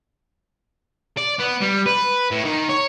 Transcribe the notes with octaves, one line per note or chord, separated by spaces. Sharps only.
D5
B3
G3
B4
A2
D#3
C#5